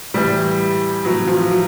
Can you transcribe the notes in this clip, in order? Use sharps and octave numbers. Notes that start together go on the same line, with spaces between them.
A2 E3 G3
A2 E3 F#3
F3
F#3